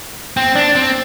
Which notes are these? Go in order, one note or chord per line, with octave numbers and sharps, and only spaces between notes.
C4
D4
C4